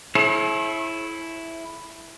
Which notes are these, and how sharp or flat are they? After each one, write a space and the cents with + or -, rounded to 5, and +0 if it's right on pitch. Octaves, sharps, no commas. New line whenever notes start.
E4 +0 A4 -45 C#5 -45